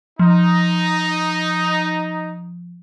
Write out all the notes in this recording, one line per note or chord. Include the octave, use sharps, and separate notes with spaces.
F3 D#4